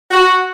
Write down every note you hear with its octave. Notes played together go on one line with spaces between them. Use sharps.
F#4